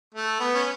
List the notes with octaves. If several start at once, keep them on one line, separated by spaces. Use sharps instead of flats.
A3
B3
C#4